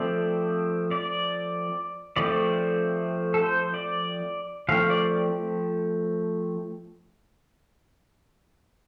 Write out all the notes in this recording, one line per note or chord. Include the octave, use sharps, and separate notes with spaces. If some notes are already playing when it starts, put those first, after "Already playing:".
Already playing: F3 A3 C4 D5
D5
F3 A3 C4 D5
A4
C5
D5
F3 A3 C4 F5
D5